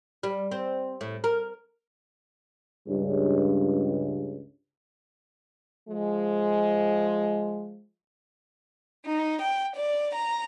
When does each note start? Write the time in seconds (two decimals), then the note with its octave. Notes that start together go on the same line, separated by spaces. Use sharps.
0.23 G3
0.51 C4
1.01 A2
1.24 A#4
2.87 C#2 G2
5.88 F3 G#3
9.05 D#4
9.40 G5
9.74 D5
10.14 A#5